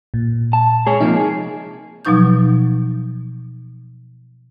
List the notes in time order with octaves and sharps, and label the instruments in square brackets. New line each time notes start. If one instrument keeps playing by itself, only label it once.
[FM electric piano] A#2
[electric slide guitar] A5
[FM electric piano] G#3 [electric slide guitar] G#4 C#5
[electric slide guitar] C3 F3 A#3 [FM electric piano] D#4
[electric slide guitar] G#4
[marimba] B2 F3 F#3 D#4 C#6 G6